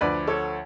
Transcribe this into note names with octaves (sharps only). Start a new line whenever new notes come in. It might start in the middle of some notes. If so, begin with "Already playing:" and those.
D2 D3 F3 B4 D5
A4 C#5